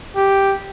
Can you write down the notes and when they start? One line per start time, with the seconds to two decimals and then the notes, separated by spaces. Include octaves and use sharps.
0.16 G4